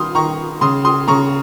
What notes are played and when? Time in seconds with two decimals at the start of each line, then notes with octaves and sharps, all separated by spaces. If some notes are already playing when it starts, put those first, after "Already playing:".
Already playing: D#3 C6 D#6 F6
0.15 D#3 A#5 C#6
0.61 C#3 C6 D#6
0.85 C6 D#6
1.08 C#3 A#5 C#6